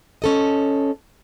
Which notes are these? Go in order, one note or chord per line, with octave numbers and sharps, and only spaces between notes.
C#4 A4 D#5